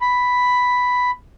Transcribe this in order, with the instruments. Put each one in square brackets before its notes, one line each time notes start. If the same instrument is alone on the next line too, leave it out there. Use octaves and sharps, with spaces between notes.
[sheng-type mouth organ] B5